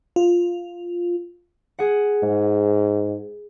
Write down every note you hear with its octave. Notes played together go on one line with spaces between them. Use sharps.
F4
G#4 F#5
G#2